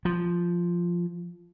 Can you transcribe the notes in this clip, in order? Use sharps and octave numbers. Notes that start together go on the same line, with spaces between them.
F3